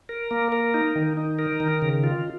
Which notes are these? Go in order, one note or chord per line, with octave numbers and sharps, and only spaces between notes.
A#4
A#3
A#4
D#4
D#3
D#4
A#4
D#3
C#3
F4